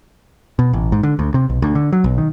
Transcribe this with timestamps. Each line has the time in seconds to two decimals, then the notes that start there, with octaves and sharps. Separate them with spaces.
0.59 B2
0.73 A1
0.92 G#2
1.03 D3
1.19 D2
1.34 C3
1.50 B1
1.62 D2
1.75 D3
1.93 F#3
2.04 B1
2.18 D#3